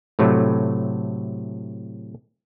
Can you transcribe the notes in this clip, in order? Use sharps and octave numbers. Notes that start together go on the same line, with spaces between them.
A2 C3 F#3 A3